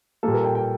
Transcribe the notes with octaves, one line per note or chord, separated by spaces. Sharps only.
A#2 G3 A#3 A4
A#4
G5
G5